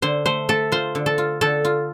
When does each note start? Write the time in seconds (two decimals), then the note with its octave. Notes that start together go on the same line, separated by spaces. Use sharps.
0.02 D3 C5
0.26 A3 C5
0.49 A3 A4
0.72 F4 C5
0.95 D3
1.06 A4
1.18 F4
1.41 D3 A4
1.65 F4